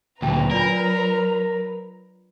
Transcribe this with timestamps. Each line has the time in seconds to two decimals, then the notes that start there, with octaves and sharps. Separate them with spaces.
0.22 D2 A#2 F#3 G#4 B4 G5 A5 A#5
0.51 D4 F4 A#4 D5